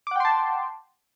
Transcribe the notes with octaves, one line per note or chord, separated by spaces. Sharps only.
F#5 G5 A5 C6 D6